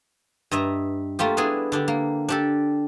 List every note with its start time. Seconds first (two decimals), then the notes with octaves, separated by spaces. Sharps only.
0.51 G2 D#5 E5 A#5
1.19 A3 A#3 F4 G4
1.37 B3 D4 E4 G#4
1.72 D3 D4 G4
1.88 A#3
2.29 D4 G4 A4